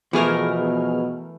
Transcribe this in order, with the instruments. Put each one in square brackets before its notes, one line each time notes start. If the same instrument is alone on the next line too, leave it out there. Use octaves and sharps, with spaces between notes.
[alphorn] B2 [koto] E3 A3 A#4 [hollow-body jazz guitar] F3 [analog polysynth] B3 G#4 F6